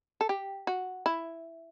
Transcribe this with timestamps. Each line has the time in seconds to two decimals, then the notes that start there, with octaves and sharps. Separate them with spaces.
0.21 A4
0.29 G4
0.67 F#4
1.06 E4